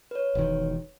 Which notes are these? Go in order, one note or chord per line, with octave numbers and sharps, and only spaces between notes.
B4 C#5
E1 E2 D#3